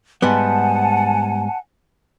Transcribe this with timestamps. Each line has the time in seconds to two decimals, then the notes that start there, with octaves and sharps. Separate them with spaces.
0.22 G#2 G3 B3 F#5 G#5 A5